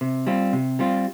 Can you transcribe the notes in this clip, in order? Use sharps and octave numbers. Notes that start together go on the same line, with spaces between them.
C3
G3 C4 F4
C3
G3 C4 F4